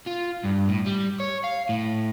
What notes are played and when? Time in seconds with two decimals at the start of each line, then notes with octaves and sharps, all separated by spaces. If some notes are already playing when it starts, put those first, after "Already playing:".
0.06 F4
0.44 G2
0.68 A2
0.86 G3
1.20 C#5
1.44 F5
1.69 A2